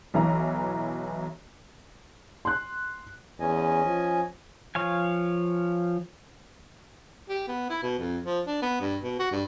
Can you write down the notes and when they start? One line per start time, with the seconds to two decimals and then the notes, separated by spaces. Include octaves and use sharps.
0.14 B1 E3 A#5
2.45 C6 F#6
3.40 E2 C#4 D#5 G#5
3.85 F3
4.75 F3 C#5 F5 G#5
7.29 G4
7.48 B3
7.70 E4
7.83 B2
7.99 F2
8.26 F3
8.47 D4
8.62 B3
8.81 G2
9.03 B2
9.20 F#4
9.32 G2